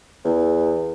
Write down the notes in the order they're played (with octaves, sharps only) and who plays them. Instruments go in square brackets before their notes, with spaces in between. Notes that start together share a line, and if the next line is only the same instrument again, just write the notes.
[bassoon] E2